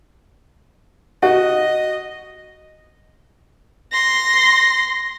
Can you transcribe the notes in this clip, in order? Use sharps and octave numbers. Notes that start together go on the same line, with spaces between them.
F#4 D#5
C6 A#6